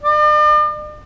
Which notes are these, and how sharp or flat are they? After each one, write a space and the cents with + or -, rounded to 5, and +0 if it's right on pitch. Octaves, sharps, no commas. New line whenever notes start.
D5 +45